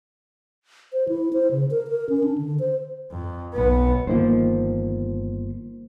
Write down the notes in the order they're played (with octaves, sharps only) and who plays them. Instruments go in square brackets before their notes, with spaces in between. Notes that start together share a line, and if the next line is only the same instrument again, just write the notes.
[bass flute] C5
E4
C5
C#3
A#4
A#4
C#4
D4
D3
C5
[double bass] F2
B1 B3
[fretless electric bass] G1 D#3 F3 [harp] A#3 C5